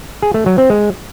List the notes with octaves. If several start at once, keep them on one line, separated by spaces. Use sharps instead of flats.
G#4
A3
F#3
C4
G#3